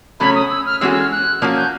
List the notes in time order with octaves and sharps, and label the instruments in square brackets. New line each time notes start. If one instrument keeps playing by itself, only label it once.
[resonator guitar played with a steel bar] C#3 F#3 A3 C#4 [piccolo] B5
[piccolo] D#6
E6
F6
[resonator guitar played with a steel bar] E3 G#3 C#4 F#4 A4 [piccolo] E6
[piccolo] E6
F6
F#6
[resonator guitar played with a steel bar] F3 A#3 C#4 F#4
[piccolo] G6